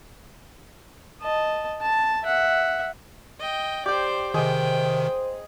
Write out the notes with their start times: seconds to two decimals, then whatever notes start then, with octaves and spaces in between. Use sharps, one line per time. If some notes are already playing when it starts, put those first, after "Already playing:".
1.22 D#5 A5
1.82 A5
2.23 E5 F#5
3.40 D#5 G5
3.86 G4 C5 D5 G5
4.34 C3 D#3 G#4 C5 D#5 G5